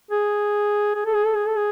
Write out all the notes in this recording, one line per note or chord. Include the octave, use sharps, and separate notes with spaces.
G#4
G#4
A4
G#4
A4
G#4
A4
G#4